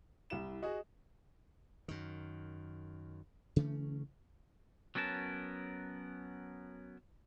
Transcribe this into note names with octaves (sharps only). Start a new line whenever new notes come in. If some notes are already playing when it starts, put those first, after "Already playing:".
C2 E4 E7
F#4 G#4 D#5
F#2 D#3
C#3 E3 A3 C#4
F#3 B3 C#4 A#4 A5